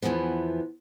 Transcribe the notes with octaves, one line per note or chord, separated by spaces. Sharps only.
E2 G#2 E3 F3 B3